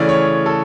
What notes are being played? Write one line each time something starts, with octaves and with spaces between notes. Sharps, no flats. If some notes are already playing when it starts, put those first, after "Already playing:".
Already playing: C#3 E3 A3 C#4 D5
C#5
A4